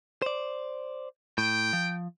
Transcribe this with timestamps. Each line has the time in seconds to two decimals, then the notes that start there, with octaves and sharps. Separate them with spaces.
0.22 C5 D5
1.38 A2 G5
1.73 F3